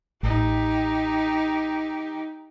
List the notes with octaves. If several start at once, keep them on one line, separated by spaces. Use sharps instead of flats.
A1 D#4 G4